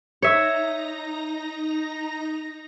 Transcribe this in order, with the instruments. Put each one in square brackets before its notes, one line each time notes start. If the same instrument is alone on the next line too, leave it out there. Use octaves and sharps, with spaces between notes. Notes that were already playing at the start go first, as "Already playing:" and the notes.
[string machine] D#4 A#5 A#6 [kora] C#5 E5